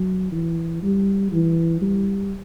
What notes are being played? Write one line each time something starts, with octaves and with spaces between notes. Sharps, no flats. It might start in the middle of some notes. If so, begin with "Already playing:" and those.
Already playing: F#3
E3
G3
E3
G3